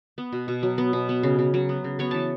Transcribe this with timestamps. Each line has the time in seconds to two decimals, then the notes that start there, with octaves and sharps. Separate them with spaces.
0.18 B3
0.33 B2
0.48 B2
0.63 F#3
0.78 B3
0.93 B2
1.09 B3
1.23 C#3
1.39 C#3
1.54 F#3
1.69 B3
1.84 C#3
1.99 B3 C#5
2.11 E3 A5